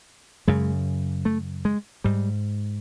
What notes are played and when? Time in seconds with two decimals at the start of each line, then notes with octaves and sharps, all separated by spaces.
0.48 F#2 C#3 G#3
1.25 A3
1.65 G#3
2.04 G#2 G3